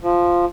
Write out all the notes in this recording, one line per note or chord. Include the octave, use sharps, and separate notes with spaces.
F3